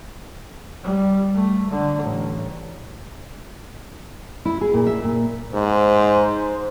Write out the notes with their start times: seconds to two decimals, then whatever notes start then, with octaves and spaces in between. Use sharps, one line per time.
0.83 G3
1.35 A3
1.70 D3
2.03 A1
4.45 E4
4.61 G#4
4.74 A#2
4.87 E5
5.04 A#2
5.54 G#2 C5